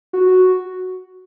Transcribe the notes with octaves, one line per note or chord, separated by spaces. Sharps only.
F#4